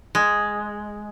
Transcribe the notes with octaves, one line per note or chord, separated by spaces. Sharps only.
G#3